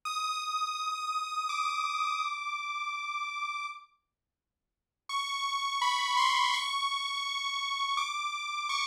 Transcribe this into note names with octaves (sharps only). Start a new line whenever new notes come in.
D#6
D6
C#6
B5
C6
C#6
D6
C#6